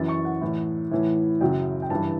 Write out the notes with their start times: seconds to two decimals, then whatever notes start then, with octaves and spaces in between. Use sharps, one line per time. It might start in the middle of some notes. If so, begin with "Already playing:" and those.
Already playing: F#2 E3 A6
0.08 C#6
0.25 F#5
0.41 A2 E3
0.91 A2 E3
1.41 F#2 C#3 F#3 G5
1.82 G5
1.90 G2 E3 A5